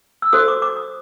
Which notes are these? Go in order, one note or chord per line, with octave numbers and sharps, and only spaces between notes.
E6
F#4 A4 C5 D#6
D6
D6
D#6